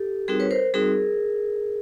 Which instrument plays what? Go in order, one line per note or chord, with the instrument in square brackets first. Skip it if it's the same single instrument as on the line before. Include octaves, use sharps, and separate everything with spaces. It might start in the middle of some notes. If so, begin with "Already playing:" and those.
Already playing: [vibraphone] G4 A4
G3 C4 D#4 F#4 G#4 A#4
B4 C#5
A#4 C5
G3 C4 D#4 F#4 G#4 A#4